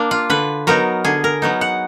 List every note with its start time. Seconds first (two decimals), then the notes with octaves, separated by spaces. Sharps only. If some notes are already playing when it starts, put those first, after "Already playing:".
Already playing: A#3 D4
0.11 F4
0.30 D3 B4
0.67 F#3 B3 D#4 A#4
1.05 D3 G#4
1.24 A#4
1.42 F#3 B3 D#4
1.61 F#5